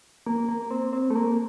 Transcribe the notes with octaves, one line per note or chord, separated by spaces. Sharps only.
A#3
A#3
C4
C4
A3
A#3